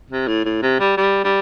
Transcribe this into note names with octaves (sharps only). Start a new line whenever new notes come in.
C3
A2
A2
C3
G3
G3
G3